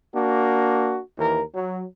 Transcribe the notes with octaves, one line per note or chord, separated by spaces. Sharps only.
A#3 D4 F#4
D#2 E3 A#4
F#3